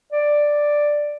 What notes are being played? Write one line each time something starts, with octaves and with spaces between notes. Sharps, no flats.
D5